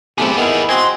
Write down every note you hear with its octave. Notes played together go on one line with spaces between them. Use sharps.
B1 A3 C4 G4 G#4 B4
D#3 B3 E4
C4 F#4 D#5 G#5 C6